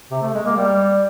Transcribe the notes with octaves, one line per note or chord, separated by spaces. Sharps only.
C3
A3
G#3
A#3
G3